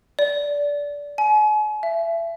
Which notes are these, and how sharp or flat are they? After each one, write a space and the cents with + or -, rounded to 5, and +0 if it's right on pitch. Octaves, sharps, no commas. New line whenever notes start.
D5 -20
G#5 +40
E5 +30